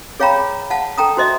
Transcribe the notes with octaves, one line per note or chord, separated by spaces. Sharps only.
G#4 C#5 F5 G5 A#5 B5
F5 F#5 A5
A4 G5 A#5 D#6
F#4 C5 D#5 E5